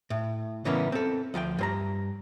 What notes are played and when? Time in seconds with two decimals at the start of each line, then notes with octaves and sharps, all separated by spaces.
0.10 A2
0.65 C#3 E3 G3 A#3 B3 C#4
0.92 C4 A4
1.34 D2 F3 F5 G5
1.59 G2 C5 A#5